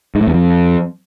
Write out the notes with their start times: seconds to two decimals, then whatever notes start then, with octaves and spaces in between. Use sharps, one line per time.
0.15 G#2
0.21 A2
0.27 E2
0.34 F2